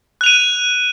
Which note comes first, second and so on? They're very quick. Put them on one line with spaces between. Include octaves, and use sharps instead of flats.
F#6 F7 D#7